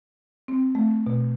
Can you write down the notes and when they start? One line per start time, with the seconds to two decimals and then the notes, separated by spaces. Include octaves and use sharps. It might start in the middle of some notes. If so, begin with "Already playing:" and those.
0.48 C4
0.75 A3
1.07 B2